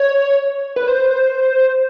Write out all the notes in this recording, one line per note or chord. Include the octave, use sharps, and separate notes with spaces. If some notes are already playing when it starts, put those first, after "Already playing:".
Already playing: C#5
B4
C5